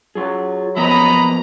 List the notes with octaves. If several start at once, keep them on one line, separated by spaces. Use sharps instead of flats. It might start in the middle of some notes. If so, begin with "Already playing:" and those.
F#3 F4 G#4
F3 A#3 B3 D#5 A#5 B5